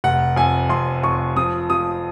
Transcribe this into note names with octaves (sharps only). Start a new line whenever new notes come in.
F1 F#5
F2 G#5
F2 C6
F2 C#6
F3 D#6
F3 D#6